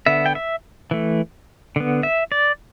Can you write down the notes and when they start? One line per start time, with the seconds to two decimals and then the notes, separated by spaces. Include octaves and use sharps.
0.06 D3 B3 E5
0.26 G5
0.35 E5
0.91 E3 A3
1.76 D3 B3
2.03 E5
2.32 D5